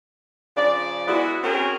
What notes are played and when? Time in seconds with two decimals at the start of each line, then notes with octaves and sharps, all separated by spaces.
0.56 C#3 F3 D5
1.08 G#3 B3 E4 F#4
1.44 C4 C#4 F#4 G#4 A#4